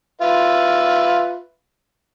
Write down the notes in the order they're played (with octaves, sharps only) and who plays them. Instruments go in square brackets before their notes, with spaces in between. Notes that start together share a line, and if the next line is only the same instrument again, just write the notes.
[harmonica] F4 B4 E5